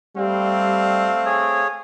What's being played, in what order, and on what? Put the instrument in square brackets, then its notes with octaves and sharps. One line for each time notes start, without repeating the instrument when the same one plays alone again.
[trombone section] G3 [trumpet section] A3 C4 F5
[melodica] G#4 C#5